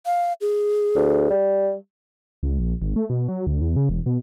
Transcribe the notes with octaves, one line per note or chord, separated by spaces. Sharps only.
F5
G#4
D2
G3
C#2
A#1
G#1
A3
B2
F#3
D2
E2
C#3
E1
B2